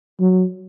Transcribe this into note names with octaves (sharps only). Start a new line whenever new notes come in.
F#3